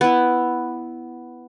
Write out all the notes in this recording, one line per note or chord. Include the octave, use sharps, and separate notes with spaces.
B3 E4